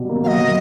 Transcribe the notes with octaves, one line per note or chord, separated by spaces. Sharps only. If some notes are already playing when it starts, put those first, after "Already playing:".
Already playing: B2 F#3 G3
A#3
F#3 D#5 F5
F#3